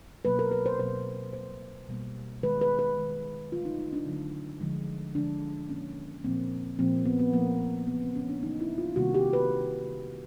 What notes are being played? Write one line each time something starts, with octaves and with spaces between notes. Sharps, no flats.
B2 F#3 A#3 B4
A#4
B4
C5
B2 F#3 A#3 C5
B2 G3 A#3 C5
B2 G3 A#3
D#3 G#3 B4
B4
B4
D#3 G#3
D3 F#3 A3 F4
D#4
D#4
D4
D3 F#3 A3
D3 F3 G#3
D3 F3 G#3 D4
A#2 F3 A#3 C#4
A#2 F3 A#3 C4
A#2 F3 A#3 C4
B3
B3
A#2 F3 A#3
C#3 E3 G3 A#3 B3
C4
C#4
D4
C#3 E3 G3 A#3 D#4
E4
F4
C3 D#3 G3 A#3 F#4
G4
B4